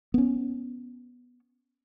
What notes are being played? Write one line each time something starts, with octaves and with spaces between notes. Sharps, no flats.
B3 C#4